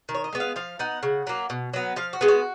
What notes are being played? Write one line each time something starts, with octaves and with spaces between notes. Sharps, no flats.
D#3
C#5
D#5
G#3 B3
F5
F3 F5
B3 D#4 F#5
C#3
F#3 A#3
B2
F#3 B3
F3 F5
F#4
G#3 B3
F#4